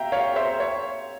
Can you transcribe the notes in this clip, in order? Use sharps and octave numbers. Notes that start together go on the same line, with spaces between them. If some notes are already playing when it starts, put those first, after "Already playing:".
Already playing: E5 F5 G5 A#5
C#5 F5
C5 E5
C#5